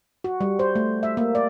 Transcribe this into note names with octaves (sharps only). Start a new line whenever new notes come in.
F#4
G3
C5
A3
E5
A#3
D5